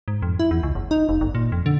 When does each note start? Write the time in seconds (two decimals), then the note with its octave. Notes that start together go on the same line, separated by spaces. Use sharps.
0.08 G#2
0.22 F2
0.39 E4
0.51 E2
0.63 C#2
0.75 F#1
0.91 D#4
1.09 F1
1.21 G1
1.35 A#2
1.52 F2
1.66 D3